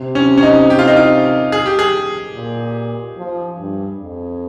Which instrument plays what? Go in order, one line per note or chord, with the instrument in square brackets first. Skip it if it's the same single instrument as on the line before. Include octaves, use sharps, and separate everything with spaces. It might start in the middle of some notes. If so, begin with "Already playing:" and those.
Already playing: [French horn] C3
[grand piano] C#4
C#4
D#4
G4
F4
D#4
F4
G#4
G4
G#4
[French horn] A#2
F3
G2
F2